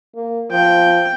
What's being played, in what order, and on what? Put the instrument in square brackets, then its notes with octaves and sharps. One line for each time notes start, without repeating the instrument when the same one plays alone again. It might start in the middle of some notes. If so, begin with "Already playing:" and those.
[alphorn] A#3
[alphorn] F3 [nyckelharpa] G5